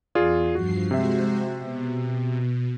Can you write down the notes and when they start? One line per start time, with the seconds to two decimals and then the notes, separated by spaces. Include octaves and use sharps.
0.15 E2 F4 G#4 D5
0.55 G2 F3 F#4 C7
0.91 C3 G#3 F#4 C5 E5
1.60 B2